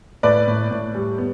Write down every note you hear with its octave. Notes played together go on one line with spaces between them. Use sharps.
A2 B4 D5
A2
A2
G3
B3